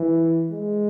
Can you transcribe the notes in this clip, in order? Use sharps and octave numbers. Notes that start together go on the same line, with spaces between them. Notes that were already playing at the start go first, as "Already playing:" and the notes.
Already playing: E3
G#3